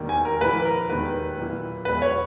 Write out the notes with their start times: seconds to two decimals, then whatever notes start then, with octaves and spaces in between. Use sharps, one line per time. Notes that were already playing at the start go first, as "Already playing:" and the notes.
Already playing: E1 D#2 D#3 A#3
0.09 G#5
0.25 A#4
0.41 A#1 A#2 A#3 E4 B4
0.65 A#4
0.89 E1 D#2 D#3 G#3 B4
1.37 B1 A#2 A#3 E4
1.85 E1 E2 B2 G#3 B3 B4
2.02 C#5